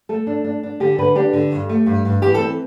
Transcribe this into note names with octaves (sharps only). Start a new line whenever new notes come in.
A3 A4
D4
D4
D4
D3 G4
D3 B4
D4 G4
D3
G2
A3
G2
G2
E3 G4
A4
C4